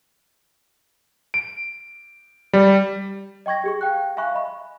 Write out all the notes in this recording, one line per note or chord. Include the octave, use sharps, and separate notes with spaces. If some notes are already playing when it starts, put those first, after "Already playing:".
D7
G3
D#5 G5 C#6 G#6 A#6
G4 G#4 C#6
F5 G5 F#6
E5 F5 G#5 B5 C#6 F#6
D#5 B5 C#6